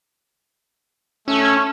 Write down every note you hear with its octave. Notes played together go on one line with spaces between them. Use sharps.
A3 C#4 E6